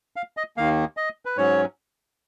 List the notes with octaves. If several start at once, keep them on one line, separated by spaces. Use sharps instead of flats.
F5
D#5
D#2 D#3 A#3 F5
D#5
B4
G#2 F#3 C#4 C#5